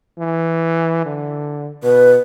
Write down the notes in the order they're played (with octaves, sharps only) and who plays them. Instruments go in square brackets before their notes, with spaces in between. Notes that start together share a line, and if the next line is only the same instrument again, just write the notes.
[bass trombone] E3
D3
[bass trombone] B2 [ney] B4